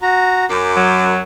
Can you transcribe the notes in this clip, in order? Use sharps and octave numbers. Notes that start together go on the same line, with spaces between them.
F#4 A#5
F#2 D6
F#3